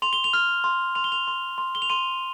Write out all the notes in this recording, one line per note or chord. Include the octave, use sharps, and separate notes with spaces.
C6 F7
G7
F7
F6
C6
C6 F7
G7
F7
C6
C6
G7
F7
C6 D#7